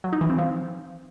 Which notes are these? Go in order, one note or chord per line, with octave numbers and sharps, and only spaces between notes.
F#3
D#4
E3
C4
F3